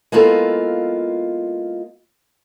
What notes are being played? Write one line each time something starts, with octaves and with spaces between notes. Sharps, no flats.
G#3 A#3 B3 E4 F4 A4